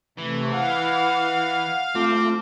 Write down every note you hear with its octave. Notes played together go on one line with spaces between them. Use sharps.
C3 E3 A3
F5 F#5
A3 C4 F4 D6